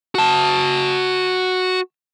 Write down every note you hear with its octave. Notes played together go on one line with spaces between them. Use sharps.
F#4 A5